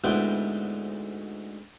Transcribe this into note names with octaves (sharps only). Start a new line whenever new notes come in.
D2 G#2 G#3 B3 E4 G5